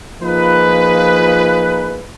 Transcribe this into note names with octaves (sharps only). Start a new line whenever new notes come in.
F3 A#3 D#4 F4 G#4 B4